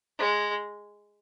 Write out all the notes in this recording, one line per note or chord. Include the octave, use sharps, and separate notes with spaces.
G#3